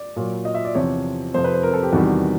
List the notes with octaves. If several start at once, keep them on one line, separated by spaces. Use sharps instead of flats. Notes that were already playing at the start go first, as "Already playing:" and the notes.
Already playing: D5
A#2 F#3
D#5
E5
D5
E2 C3 F3 C#5
F2 C3 F3 C5
B4
C5
A#4
A4
G4
E2 C3 D#3 G3 F#4